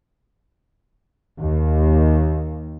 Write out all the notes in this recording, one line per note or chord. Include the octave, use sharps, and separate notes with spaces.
D#2